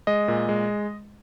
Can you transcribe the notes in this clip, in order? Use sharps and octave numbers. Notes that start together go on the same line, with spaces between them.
G#3 D#5
A#2
G#3